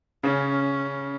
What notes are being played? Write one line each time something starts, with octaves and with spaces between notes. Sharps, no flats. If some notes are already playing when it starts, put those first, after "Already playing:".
C#3 C#4